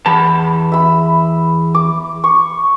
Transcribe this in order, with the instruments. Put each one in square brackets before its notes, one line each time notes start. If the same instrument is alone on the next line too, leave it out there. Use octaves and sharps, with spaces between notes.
[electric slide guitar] E2 A5 [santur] B5
[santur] E5 B5
D6
C#6